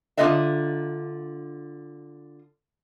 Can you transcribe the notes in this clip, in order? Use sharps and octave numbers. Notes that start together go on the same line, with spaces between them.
D3 A#3 F4 B4 D#5 E5